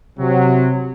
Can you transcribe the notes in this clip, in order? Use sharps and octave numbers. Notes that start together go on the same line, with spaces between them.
C3 F#3